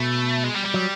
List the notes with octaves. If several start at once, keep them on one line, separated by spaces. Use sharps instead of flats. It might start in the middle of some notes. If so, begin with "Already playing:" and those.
Already playing: B2 A3
G#3
G3
G3
F#3